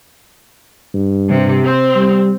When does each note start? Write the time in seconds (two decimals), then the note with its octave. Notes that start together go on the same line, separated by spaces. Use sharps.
0.94 G2
1.29 C3
1.66 C4
1.96 G3